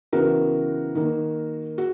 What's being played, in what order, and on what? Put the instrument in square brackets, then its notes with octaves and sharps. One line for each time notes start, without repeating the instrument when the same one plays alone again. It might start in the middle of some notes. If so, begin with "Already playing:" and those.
[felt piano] C#3 E3 B3 F#4 A#4
D#3 A#3
F#4